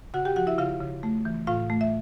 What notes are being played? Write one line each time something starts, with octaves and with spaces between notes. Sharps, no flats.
C#3 F#4 F#5
G4 G5
F3 F#4 F#5
E4 E5
C#3 F4 F5
C#3
A3
E3
A2 F4 F5
A3
E5